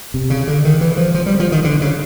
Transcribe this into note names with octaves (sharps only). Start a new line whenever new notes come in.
C3
C#3
D3
D#3
E3
F3
F3
G3
F3
D#3
D3
C#3